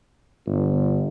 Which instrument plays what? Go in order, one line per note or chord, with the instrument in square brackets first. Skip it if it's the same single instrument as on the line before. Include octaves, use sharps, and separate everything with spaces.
[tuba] G1